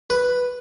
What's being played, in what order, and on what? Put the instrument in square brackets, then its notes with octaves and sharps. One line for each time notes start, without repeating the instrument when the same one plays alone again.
[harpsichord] B4